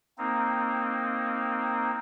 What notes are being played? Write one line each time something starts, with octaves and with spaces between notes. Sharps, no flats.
A#3 C4 D#4